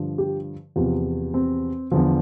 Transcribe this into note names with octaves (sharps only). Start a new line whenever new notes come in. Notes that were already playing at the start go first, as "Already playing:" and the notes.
Already playing: G2 D3 F3
G4
E2 C3 F3 F4
C4
E2 D3 F3